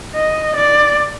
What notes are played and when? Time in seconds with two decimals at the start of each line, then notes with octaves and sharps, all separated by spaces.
0.16 D#5
0.57 D5